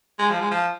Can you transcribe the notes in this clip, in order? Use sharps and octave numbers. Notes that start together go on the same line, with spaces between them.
G#3
F3
G#3
F3